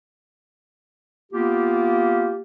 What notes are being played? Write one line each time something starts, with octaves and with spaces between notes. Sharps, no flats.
A#3 B3 F4 G4